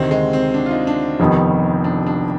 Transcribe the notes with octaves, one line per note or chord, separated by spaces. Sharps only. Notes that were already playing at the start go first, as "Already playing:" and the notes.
Already playing: D2 C3 D#3 C4
G#3
C4
D4
F4
D#4
D4
F1 F2 D#3 G3 B3
D4
D4